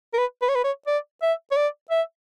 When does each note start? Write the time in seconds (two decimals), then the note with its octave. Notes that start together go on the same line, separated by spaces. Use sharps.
0.13 A#4
0.18 B4
0.42 B4
0.49 C#5
0.55 B4
0.64 C#5
0.87 D5
1.22 E5
1.52 C#5
1.57 D5
1.91 E5